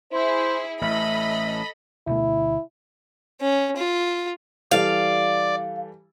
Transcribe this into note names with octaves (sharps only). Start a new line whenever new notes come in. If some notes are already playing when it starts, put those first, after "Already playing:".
E4 G#4 C5
A1 A3 A4 D#5 E5 B5
D2 B2 A3 E4
C#4
F4
E3 G3 A4 D5 F5